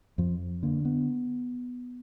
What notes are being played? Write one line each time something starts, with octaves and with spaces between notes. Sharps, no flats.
F2 F3
D3 A#3
B3